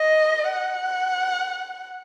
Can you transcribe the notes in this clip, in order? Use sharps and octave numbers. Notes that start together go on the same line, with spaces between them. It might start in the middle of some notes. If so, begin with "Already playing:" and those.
Already playing: D#5
F#5